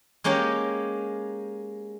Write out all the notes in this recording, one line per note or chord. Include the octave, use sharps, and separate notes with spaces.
G#3 A#3 C#4 G4 C#5